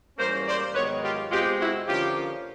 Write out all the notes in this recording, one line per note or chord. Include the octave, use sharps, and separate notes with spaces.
G#2 E3 G3 A#3 C#4 A#4 C5
C5 D5
G#2 D#3 F#3 B3 B4 C#5
F4 G4
B2 G#3 C4 F4 G4
E4 F#4
D3 F3 A#3 C#4 F4 G4